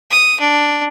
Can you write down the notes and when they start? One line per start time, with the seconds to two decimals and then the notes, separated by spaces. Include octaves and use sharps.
0.10 D#6
0.40 D4